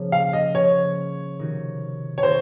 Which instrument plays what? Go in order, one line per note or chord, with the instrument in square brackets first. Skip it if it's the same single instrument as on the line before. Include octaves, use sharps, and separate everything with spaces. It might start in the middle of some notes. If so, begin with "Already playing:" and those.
Already playing: [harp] C#3 F3 A#3 C#4
[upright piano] F5
D#5
[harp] C#3 F3 A#3 C#4 [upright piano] C#5
[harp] C3 D#3 A#3 D#4 F#4
[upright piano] C#5
[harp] C3 D#3 A#3 D#4 F#4 [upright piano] C5